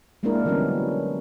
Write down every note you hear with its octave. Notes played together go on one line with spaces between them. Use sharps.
G#3 A#3 C4 D4 E4 A#4
D3 E3 F#3 G3 B3 C#4